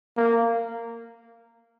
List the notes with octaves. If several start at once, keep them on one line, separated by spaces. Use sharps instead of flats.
A#3